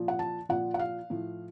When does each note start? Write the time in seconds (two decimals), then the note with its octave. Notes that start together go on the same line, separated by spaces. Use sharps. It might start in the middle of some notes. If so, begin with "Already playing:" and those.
Already playing: A#2 F3
0.08 F#5
0.19 A5
0.49 A#2 F3 F#5
0.74 F#5
0.79 F5
1.10 A2 F3